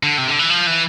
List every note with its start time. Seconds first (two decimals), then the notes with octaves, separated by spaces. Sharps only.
0.03 D3
0.18 C3
0.28 D3
0.39 E3
0.50 F3
0.67 E3